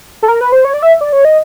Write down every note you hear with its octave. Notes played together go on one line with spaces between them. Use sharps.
A4
A#4
B4
C5
C#5
D5
E5
D5
C#5
D#5